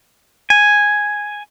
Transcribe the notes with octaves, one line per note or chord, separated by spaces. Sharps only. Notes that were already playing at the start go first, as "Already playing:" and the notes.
G#5